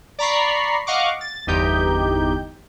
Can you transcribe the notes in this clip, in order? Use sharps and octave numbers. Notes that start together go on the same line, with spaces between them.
D5 A#5 B5 C#6 C7
D#5 F5 F#5 C#6 D6
A6
G1 E2 D#4 G4 G6